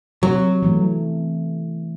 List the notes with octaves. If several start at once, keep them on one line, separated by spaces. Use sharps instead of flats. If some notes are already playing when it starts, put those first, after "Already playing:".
C3 F#3
E3 A3